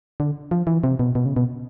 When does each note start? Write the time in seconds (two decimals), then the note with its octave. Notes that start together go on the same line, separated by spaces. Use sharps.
0.20 D3
0.51 F3
0.67 E3
0.84 C3
0.99 B2
1.15 B2
1.26 C#3
1.36 B2